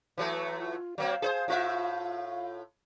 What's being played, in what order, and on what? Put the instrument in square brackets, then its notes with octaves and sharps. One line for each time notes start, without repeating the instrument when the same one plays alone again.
[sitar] E3 F#3 A3
[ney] F4
[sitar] F#3 A#3 C4 [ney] F5
[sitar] G#4 B4 C5
A2 F4 E5